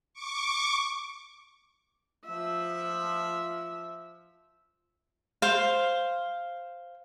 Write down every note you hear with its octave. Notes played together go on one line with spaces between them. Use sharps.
C#6 D6
F3 E5
C5 F5